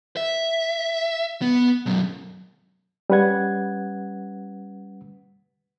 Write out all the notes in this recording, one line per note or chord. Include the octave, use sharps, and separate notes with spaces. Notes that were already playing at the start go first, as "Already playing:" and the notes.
E5
B3
B1 F#2
G3 C#4 B4 F#5 G#6